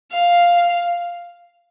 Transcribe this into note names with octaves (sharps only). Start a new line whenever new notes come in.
F5